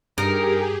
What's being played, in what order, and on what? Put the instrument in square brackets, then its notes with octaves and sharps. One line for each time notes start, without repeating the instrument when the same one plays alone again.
[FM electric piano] G2 [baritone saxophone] D#4 [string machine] G4 G#4 [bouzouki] A#4